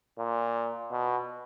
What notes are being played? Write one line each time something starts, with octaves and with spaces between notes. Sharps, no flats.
A#2
B2